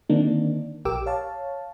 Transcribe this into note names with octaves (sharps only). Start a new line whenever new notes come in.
D3 D#3 A#3 C4 D4 D#4
A#1 G4 A#4 G5 D6 E6
C#5 F5 A5